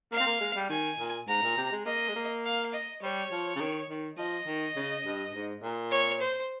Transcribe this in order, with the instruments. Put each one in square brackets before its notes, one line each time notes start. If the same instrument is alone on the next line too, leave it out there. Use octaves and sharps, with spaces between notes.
[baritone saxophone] A#3 [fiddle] F5
[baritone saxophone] C4
A#3
G#3
G3
[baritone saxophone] D#3 [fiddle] G#5
[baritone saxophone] A#2
[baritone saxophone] G#2 [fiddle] A#5
[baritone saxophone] A#2
C3
G#3
[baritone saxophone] A#3 [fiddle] D#5
[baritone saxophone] G#3
A#3
[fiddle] F5
D#5
[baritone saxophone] G3 [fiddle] C#5
[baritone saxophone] F3
C#3
D#3
D#3
[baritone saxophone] F3 [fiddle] D#5
[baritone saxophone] D#3
C#3
G2
G#2
A#2
[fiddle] C#5
C5